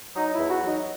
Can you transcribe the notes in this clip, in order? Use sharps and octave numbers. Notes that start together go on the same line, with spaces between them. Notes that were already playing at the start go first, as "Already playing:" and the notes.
F#3 D#4
E4
E2
F#4
F#3
D#4